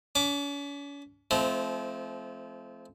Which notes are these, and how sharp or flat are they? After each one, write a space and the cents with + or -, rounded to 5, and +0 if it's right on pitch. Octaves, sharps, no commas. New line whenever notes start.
C#4 +40 D6 +0
F3 -25 A3 -35 C4 +0